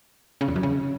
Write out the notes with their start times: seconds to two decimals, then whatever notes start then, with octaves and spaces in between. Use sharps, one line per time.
0.41 C#3
0.48 E2
0.56 F#2
0.63 C#3